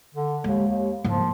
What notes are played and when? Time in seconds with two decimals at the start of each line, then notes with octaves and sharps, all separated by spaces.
0.14 D3
0.44 D#2 G#3
0.67 D#2
1.04 G#2 F3 A#3